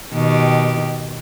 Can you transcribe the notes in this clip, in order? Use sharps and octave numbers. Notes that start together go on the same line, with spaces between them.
B2 D#3 G4